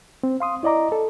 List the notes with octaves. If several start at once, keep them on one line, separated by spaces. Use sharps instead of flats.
C4
F5 C6 D#6
E4 D5 D#5 A#5 D6
A4